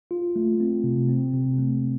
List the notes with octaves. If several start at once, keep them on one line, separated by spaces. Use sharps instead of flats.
F4
A3
C4
C3
C4
C3
A3